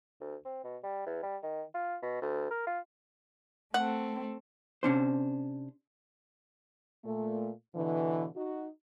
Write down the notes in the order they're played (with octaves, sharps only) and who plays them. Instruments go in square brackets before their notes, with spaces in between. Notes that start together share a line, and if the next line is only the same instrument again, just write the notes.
[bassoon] D2
C4
B2
G3
E2
G3
D#3
F4
B2
D2
A#4
F4
[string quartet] A3 C4 A4 [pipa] F#5
[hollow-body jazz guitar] C3 C#4 D4 C5
[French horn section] A#2 A3
B2 D3 E3
D#4 F#4